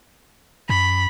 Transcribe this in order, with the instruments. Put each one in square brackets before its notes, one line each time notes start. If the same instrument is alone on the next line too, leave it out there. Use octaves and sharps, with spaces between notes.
[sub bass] F#2 [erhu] B5